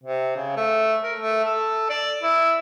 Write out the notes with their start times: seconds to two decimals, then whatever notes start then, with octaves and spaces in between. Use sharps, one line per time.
0.04 C3
0.37 C#3
0.57 A3
1.04 A#4
1.17 A3
1.45 A4
1.90 D5
2.23 E4